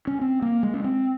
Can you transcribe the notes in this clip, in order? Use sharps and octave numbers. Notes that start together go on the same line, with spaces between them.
C#4
C4
A#3
G#3
C#4
C4